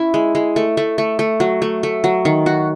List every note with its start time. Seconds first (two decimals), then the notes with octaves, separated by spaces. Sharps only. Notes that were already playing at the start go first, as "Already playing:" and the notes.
Already playing: C#4 E4
0.14 G#3
0.35 G#3
0.56 A3
0.77 A3
0.98 A3
1.19 A3
1.40 F#3
1.62 A3
1.83 A3
2.04 F#3
2.25 D#3
2.46 F#4